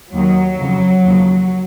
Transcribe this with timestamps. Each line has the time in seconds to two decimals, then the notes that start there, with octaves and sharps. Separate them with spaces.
0.13 D#2 D#3 F#3
0.59 F2 C#3 F3
1.05 D#2 C#3 F3